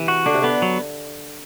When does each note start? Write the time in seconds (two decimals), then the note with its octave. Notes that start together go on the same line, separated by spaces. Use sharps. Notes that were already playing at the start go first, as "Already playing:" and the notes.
Already playing: C3 E3
0.08 F#4
0.26 D3 D4
0.34 C3
0.42 D3 B3
0.62 F#3